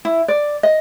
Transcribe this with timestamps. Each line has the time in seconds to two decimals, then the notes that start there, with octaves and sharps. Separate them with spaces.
0.05 E4
0.28 D5
0.63 D#5